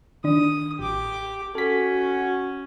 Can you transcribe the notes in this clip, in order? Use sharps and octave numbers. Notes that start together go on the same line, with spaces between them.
D#3 D4 D#6
A1 G4 D6
C#4 F#4 A4 B6